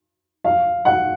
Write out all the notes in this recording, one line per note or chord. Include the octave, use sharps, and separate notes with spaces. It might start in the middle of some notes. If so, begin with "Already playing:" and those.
F5
F#5